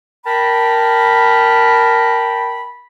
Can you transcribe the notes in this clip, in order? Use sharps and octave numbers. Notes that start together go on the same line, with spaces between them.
A#4 G5 A5 B5